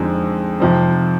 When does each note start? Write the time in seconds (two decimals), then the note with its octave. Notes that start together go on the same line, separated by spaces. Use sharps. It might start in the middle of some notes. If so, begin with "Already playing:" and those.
Already playing: F2 D3 G#3 C4 D#4
0.60 F2 C3 F3 C4 D#4